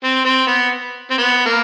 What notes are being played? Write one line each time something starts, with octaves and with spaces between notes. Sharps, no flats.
C4
C4
B3
C4
B3
A#3